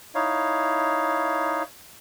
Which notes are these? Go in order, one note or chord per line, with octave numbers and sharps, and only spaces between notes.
D#4 E4 C#5 F5